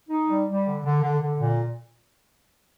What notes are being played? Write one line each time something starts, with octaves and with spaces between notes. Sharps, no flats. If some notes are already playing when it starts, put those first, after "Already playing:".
D#4
G3
G3
D3
D3
D3
D3
A#2